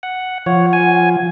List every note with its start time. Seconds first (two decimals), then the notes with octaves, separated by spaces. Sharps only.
0.03 F#5
0.46 F3 C#5 F#5
0.73 G#5